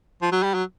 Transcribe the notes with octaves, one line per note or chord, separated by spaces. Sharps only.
F3
F#3
G3
F#3